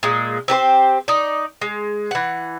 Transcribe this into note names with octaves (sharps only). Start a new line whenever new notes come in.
A#2 G#3
C4 G4 B4 C5
D#4 D5
G#3
E3 F#5